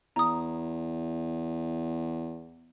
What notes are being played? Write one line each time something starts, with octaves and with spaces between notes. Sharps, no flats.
E2 A#5 D#6